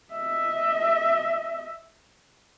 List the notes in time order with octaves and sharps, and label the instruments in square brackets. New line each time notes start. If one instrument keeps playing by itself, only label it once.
[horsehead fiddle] D#5 E5